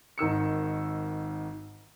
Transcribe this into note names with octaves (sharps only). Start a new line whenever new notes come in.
G#1 D#3 E6 C#7